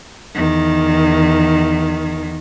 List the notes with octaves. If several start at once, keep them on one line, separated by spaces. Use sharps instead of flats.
E2 D#3